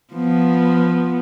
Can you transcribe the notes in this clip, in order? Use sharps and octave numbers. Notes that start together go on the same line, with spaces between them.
F3 B3